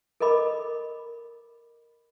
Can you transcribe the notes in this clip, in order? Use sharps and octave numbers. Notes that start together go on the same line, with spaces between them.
A4 A#4 D#5 B5 D6